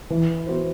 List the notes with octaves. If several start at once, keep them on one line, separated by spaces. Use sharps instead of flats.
E3
B3 F#4 C5